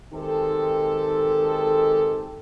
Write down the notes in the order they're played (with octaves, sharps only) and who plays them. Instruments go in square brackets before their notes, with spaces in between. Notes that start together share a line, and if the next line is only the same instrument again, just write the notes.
[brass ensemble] D#3 G#3 C4 G4 A4